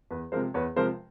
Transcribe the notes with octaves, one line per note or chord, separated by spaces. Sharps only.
E2 B4
C3 F3 G#3 A#4 C5
E2 B4 C#5
C3 F3 G#3 A#4 C5